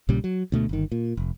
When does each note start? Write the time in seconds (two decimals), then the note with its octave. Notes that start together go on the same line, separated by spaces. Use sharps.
0.09 A#1 A#2 C#3 G3
0.24 F#3
0.52 D2 B2 A3
0.69 G1 D#3
0.92 A#2
1.17 F1